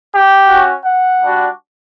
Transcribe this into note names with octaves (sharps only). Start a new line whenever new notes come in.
G4
C#4 F#4
F#5
G3 D4 F#4